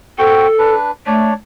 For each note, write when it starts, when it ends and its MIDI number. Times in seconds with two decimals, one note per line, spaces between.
0.18 0.47 60
0.18 0.47 66
0.18 0.74 69
0.18 0.47 79
0.59 0.91 62
0.59 0.91 71
1.07 1.31 57
1.07 1.34 62
1.07 1.34 73
1.07 1.34 74